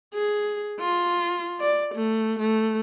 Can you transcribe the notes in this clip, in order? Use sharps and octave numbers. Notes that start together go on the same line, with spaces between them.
G#4
F4
D5
A3
A3